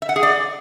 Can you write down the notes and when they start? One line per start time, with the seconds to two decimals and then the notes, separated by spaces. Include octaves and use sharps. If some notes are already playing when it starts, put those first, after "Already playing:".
0.02 E5
0.09 F#5
0.16 G#4
0.23 D5